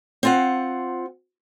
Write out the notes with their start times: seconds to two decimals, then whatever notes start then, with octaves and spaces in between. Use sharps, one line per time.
0.23 C4 F4 F#5